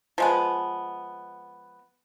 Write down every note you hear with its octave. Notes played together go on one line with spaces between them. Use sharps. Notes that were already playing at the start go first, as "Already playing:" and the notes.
F3 G#3 B3